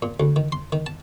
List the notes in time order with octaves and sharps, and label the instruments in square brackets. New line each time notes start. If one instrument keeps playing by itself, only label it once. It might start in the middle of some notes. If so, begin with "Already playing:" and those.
[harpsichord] A#2
D2
D#3
C6
D#3
A5